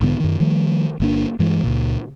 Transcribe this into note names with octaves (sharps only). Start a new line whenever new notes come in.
B1 G#2 D3 B3
F#2 D#3
D#3 F3 G3 A3
G1 A#3 D4
G2 E3 G#3
C#2 A#2